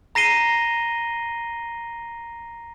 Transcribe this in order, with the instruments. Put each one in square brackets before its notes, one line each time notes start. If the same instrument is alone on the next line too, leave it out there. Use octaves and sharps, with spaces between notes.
[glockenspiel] A#5 A#6 C7 D#7 G7